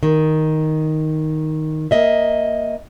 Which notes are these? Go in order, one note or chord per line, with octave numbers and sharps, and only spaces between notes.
D#3
A#3 D#5 E5